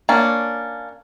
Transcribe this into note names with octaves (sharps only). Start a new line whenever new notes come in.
A#3 C#4 D4 D5